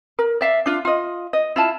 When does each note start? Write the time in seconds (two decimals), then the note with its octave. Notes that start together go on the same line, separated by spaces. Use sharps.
0.19 A#4
0.41 D5 E5 F5
0.66 D4 F4
0.85 F4 D#5
1.33 D#5
1.56 E4 F4 A5